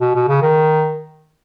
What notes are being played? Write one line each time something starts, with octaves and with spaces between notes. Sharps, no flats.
B2
B2
C#3
D#3